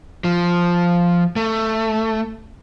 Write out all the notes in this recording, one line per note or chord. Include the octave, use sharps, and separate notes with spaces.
F3
A3